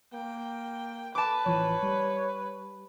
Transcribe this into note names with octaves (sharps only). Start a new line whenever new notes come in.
A#3 G5
B4 A5 D6
A1 E3 F3 C#5
G3